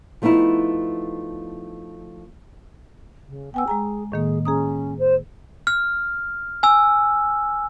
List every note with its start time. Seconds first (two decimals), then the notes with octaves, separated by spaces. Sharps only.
0.22 F3 A3 B3 D#4 E4
3.29 C#3
3.54 B3 G5 G#5 E6
3.68 G#3 G#4 G#5 A#5
4.12 A2 D#3 A#3 G#4
4.45 C#4 G#4 A#5 D#6
4.99 C5
5.67 F6
6.63 G#5 E6